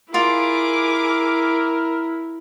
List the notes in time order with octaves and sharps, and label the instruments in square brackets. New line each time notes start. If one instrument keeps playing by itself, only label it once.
[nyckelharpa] E4 [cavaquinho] F4 [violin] G#4 D6 [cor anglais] A#4